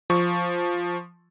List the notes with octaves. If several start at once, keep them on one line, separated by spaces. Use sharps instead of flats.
F3 C#6